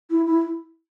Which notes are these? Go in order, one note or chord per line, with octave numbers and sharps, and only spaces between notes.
E4
E4